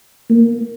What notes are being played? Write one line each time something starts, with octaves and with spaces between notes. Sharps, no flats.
A#3